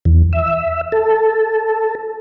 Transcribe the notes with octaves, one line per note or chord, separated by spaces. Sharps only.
E2
E5
A4